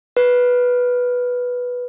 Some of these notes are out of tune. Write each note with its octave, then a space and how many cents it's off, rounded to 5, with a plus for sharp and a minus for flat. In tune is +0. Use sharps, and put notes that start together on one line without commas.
B4 -5